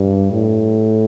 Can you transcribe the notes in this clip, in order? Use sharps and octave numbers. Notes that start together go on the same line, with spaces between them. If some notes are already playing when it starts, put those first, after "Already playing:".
Already playing: G2
A2